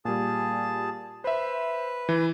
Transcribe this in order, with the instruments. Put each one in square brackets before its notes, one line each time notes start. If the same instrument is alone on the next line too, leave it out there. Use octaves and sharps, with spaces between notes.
[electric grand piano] A#2 G3 [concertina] G#4 A5
[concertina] B4 [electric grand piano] C5 E5
[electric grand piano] E3